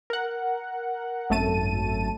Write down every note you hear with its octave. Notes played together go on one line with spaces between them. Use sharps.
A#4 F#5
G#1 F#2 A3 A5 D#7